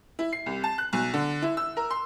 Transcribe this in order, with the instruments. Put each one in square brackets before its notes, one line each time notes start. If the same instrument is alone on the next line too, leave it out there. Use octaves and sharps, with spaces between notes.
[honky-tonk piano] E4
C7
C2
A5
F#6
B1
D3
E4
E6
A#4
C6